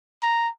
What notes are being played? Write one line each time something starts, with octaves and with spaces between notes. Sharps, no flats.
A#5